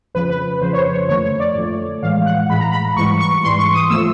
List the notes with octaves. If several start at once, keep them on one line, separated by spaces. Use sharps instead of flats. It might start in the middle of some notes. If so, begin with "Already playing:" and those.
F2 C#3 F3 B4
B4
F2 C#3 F3 C5
C#5
C5
C#5
F#2 D3 F3 A3 C#5
C#5
D5
F#2 D3 F3 A3
A2 E3 G#3 F5
F#5
A2 E3 G#3 B5
A#5
B5
G#2 E3 G3 C#6
C#6
G#2 E3 G3 C6
C#6
D#6
F3 A3 E6